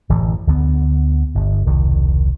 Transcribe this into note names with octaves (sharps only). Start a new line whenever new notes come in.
D1 A1 F#2 E3
D2 D3 B3
G1
E1 C2 D#3